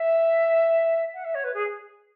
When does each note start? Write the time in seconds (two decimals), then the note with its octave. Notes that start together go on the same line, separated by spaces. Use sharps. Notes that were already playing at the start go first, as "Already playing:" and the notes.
Already playing: E5
1.14 F#5
1.24 E5
1.35 C#5
1.44 B4
1.54 G#4